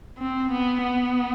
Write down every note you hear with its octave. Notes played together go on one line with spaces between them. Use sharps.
C4
B3
B3